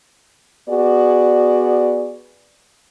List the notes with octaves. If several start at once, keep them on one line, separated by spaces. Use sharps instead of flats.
B3 F#4 G#4 D5